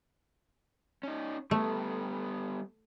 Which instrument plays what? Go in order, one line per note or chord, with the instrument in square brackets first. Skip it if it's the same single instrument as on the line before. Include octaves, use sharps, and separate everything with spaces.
[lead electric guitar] C#4 D#4
[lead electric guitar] G3 B3 [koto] A3